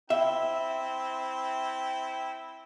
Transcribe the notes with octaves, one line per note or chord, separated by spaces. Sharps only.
C4 E4 E5 G5